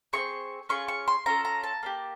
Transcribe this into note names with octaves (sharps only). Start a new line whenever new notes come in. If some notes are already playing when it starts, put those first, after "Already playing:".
C4 D#4 G#4 C#6
C#4 F4 G#4 C#6
C#6
C6
C#4 F4 A4 A#5
A#5
A5
A#3 D4 G4